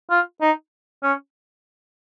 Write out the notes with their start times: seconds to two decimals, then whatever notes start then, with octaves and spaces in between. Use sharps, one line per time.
0.11 F4
0.41 D#4
1.03 C#4